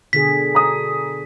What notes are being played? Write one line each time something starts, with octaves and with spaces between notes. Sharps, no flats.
B2 D3 G#4 B6
A#5 D#6